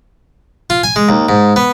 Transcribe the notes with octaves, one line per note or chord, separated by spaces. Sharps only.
F4
G#5
G#3
D#2
G#2
B3